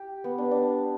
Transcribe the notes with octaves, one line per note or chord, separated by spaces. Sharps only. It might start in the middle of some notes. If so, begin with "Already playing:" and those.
Already playing: G4
B3
D4
D4